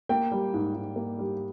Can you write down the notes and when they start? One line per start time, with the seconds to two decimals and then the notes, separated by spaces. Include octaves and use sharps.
0.09 A#3 G5
0.32 G3
0.54 G#2
0.75 G#2
0.96 A#3
1.19 G3